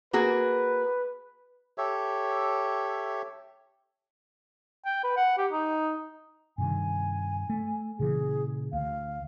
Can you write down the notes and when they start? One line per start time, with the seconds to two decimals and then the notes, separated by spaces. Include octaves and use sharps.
0.13 A#3 F#4 G#4 B4
1.78 G4 A4 C#5 E5
4.86 G5
5.04 B4
5.17 F#5
5.38 G4
5.52 D#4
6.58 G2 C3 D#3 G#5
7.49 A3
7.99 A#2 C#3 E3 G#4
8.73 D2 F5